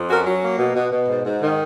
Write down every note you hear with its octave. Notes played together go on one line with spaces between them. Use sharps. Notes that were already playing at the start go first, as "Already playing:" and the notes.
Already playing: F2
C#4 F#4 A#4
F#3
A#3
B2
B2
B2
G#2
G#2
D#3